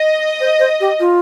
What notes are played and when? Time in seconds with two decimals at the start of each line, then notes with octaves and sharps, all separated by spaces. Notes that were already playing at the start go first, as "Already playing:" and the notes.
Already playing: D#5
0.40 C5
0.59 C5
0.80 G4
1.00 F4